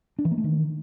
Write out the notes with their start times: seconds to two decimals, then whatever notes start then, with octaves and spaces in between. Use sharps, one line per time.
0.19 D4
0.25 E3
0.31 A#3
0.38 A3
0.44 D#3